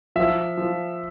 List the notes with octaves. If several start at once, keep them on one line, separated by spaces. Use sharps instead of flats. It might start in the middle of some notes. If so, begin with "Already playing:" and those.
F3 E5
F3